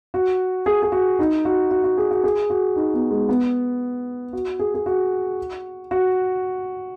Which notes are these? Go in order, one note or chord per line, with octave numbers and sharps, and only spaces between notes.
F#4
G#4
G#4
F#4
D#4
F#4
F#4
F#4
G#4
F#4
G#4
F#4
D#4
B3
G#3
B3
F#4
G#4
G#4
F#4
F#4